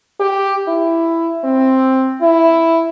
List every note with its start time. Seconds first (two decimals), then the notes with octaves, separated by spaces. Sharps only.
0.20 G4
0.68 E4
1.44 C4
2.21 E4